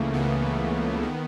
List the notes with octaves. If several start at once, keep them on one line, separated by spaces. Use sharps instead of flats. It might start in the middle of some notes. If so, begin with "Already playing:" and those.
Already playing: C#2 C#3 E3 A3 A#3
C#2 C#3 E3 B3
D#3